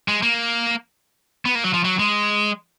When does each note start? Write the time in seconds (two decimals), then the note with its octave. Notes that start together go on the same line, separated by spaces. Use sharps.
0.08 G#3
0.22 A#3
1.45 B3
1.55 A#3
1.64 F#3
1.74 F3
1.85 F#3
1.99 G#3